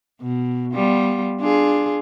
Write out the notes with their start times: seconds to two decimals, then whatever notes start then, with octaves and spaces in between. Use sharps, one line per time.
0.21 B2
0.73 G3 B3 F4
1.40 D4 F4 G#4